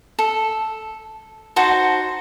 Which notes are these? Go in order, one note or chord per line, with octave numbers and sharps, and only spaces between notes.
A4
D#4 F#4 C5 A5